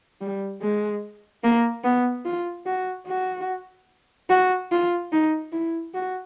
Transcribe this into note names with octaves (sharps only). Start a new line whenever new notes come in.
G3
G#3
A#3
B3
F4
F#4
F#4
F#4
F4
D#4
E4
F#4